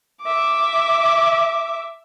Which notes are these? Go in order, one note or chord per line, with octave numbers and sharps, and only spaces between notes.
E5 D6